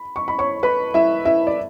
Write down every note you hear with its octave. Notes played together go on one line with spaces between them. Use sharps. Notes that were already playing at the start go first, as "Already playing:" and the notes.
Already playing: B5
C#6
B5
C#5 C#6
B4 B5
E4 E5
E4 E5
D5